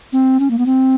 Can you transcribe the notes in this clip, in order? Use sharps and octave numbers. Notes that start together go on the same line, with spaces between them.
C4
C#4
A#3
B3
C4